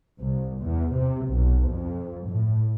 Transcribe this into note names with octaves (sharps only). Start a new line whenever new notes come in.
C2
E2
C3
B1
F2
A2